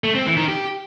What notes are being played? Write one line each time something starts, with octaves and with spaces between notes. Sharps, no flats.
A3
C4
E3
D#3
G4